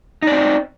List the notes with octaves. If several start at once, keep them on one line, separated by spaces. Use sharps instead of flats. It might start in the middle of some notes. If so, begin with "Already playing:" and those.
C4 D#4 D5